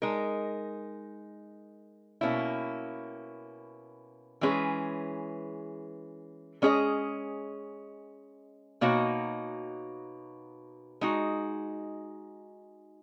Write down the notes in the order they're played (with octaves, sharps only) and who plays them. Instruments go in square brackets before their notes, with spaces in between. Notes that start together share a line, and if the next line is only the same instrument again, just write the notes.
[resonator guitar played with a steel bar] G#3 D#4 A#4
B2 A#3 C#4 E4
E3 G#3 C#4 G#4 B4
G#3 C#4 G#4 D#5
B2 A#3 D#4 F#4 C#5
G#3 D#4 F#4